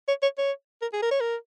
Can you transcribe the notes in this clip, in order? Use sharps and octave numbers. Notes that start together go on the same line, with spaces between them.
C#5
C#5
C#5
A#4
G#4
A#4
C#5
A#4